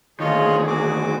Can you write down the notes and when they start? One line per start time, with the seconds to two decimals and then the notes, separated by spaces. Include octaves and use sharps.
0.20 D2 D#3 F4 G#4 C#5 D#5
0.67 F#4 D6